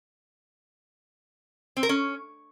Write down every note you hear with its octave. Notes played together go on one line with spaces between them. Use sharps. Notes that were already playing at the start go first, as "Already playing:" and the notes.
C4
A#4
C#4